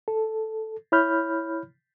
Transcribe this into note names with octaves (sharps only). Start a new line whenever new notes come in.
A4
E4 C#5 B5 F6 G6